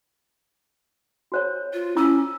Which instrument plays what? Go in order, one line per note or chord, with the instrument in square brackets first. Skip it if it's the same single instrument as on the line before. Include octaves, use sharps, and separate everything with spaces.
[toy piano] F#4 C5 C#5
[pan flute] F4
[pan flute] C#4 [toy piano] E4 D6 E6